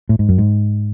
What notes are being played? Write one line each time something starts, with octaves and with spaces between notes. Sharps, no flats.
A2
G#2
F#2
G#2